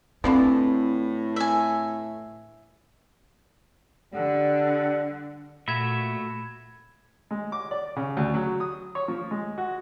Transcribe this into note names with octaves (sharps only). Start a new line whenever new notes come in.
A2 D3 E3 F3 C4
E5 G#5
D3 G3 A4 F#5
A#2 A3 F#4 E5 B5 G#6 E7
G#3
D6
D5
C#3
D2
F#3
D#6
C#5
F3
G#3
F#4